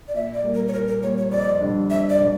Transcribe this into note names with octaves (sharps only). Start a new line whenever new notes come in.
D5
A#2 E5
D5
G3 A#3
A#4
C#5
A#2 A#4
A#4
G3 A#3 C#5
C#5
F2 D5
D3 G3 D4
F2 E5
D5
D3 G3 D4